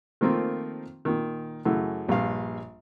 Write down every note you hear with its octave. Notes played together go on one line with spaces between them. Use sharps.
D#3 F3 A3 A#3 C4 F4
A#2 D#3
F#2 C#3 E3 A3
A#1 G2 F5